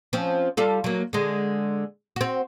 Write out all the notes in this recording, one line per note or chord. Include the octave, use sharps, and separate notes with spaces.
F3 C4 C#4
G3 F4 A4
F#3 A#3
D3 G#3
C4 F#4